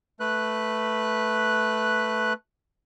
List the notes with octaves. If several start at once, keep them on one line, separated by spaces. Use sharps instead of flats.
A3 B4 F#6